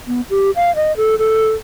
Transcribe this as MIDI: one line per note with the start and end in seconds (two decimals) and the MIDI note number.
0.07 0.21 59
0.30 0.51 67
0.56 0.74 77
0.76 0.95 75
0.97 1.18 69
1.18 1.51 69